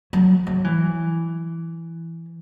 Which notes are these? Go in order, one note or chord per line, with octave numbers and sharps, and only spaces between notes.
F#3
F#3
E3